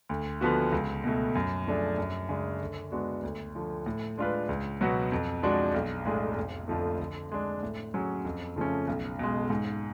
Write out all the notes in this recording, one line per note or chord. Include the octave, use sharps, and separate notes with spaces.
D2
D3 F3 B3 F#4
C#2
B2 A3
F#2
F3 A3 D4 G#4
F#2
C#3 G#3 D4 G#4
D3
G#3 B3 D4 F#4
D2
D3 F3
A2
G#3 D4 F4 B4
C#2
B2 F#3 B3 F#4
F2
F3 G#3 D4 F#4
B1
A2 G#3 D4 G#4
F1
F2 D3 F3 A3
D3
G#3 D4
A2
F#3 C#4 G#4
F2
C#3 F3 A3 C#4
B1
B2 G#3
G#2